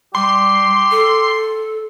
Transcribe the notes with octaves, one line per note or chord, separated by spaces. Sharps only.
G3 G4 C6
A4